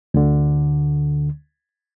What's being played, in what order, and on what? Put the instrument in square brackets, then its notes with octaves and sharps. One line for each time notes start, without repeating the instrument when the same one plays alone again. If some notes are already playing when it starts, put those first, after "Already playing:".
[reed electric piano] D2 D3